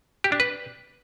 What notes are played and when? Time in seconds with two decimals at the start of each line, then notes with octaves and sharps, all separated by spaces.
0.24 G4
0.32 D4
0.40 B4